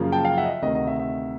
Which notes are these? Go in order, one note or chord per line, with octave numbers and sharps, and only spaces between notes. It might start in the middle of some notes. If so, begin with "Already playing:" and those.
Already playing: F#2 C#3 F3 A#3
G5 A5
F5 G5
E5 F#5
D#5
E5
D2 C3 D#3 D#5
D#5
E5
E5